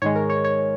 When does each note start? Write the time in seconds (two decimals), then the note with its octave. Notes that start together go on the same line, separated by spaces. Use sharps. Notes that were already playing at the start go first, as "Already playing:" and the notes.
0.02 G#2 D#3 G#3 C#5
0.16 A#4
0.30 C#5
0.44 C#5